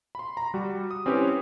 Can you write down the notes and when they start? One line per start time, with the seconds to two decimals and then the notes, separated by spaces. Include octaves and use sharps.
0.15 B5 C6
0.37 A#5
0.54 G3 F#4
0.91 D#6
1.06 C4 C#4 E4 G4 B4 C#5